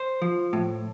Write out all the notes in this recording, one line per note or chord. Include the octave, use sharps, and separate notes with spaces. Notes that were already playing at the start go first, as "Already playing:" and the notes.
Already playing: C5
F3
A2